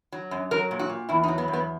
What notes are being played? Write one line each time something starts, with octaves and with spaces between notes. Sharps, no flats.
F#3
F#2
F#3 A#4
A#2
F#4
A#2
E2 E4
D#4
F#3
B3
E2
B3